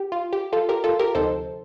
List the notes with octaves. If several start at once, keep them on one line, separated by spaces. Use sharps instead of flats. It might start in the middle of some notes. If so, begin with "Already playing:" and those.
Already playing: G4
F4
G4
F4 A4
G4 A#4
F4 A4
G4 A#4
D2 C3 F3 C4 D#4 A4 C5